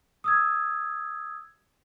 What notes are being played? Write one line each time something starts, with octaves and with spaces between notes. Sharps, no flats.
D#6 E6 G#6